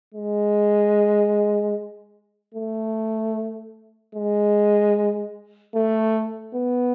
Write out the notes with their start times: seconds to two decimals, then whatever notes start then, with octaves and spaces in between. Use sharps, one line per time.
0.14 G#3
2.55 A3
4.15 G#3
5.75 A3
6.54 B3